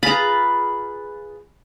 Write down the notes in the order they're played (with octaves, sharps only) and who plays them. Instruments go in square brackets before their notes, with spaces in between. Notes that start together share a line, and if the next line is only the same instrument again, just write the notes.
[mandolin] F4 G#4 B4 [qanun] A#5 B5